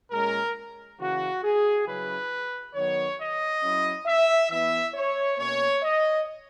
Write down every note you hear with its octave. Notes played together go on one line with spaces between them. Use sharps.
A#2 G#3 C#4 A#4
C#3 E3 A#3 F#4
G#4
C#3 F#3 C#4 E4 B4
D#3 F#3 B3 C#5
D#5
F#3 C#4 E4
E5
E3 B3 E4 E5
C#5
B2 A#3 C#4 C#5
D#5